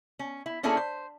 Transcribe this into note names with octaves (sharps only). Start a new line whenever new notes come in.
C#4
E4
A#3 C#4 D4 E4 G#4 A4
C5